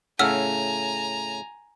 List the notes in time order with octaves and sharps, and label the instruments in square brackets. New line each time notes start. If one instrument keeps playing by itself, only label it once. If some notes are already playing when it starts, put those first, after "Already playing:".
[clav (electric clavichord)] A2 C#3 A3 [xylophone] F#5 E6 F6 [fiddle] G#5 A#5